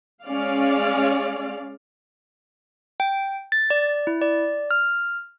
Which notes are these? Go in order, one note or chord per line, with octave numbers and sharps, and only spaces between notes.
G#3 C#4 D5 F5
G5
A6
D5
E4
D5
F6